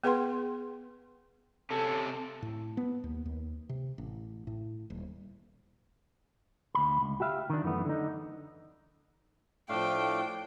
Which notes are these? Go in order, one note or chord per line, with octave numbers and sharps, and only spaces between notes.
B3 G#4 B4 F#5 G5 C6
C3 C#4 A4
A2
B3
D#2
D#2
C3
A1
A2
D#1
D2 B5
C#2
F#4 G4 E5 F5
D#3 D4
F#2 E3 A3 B3
D3 D#4
A2 F3 A3 D4 F5 G5